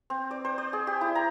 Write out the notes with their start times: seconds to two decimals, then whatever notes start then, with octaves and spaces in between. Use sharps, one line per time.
0.10 C4
0.31 D5
0.45 C5
0.58 D5
0.73 G#4
0.87 G4
1.01 E4
1.15 A#5